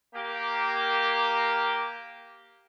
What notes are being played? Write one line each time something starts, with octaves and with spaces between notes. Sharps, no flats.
A#3 G4